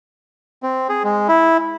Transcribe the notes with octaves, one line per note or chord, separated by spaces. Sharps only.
C4
G#4
G#3
E4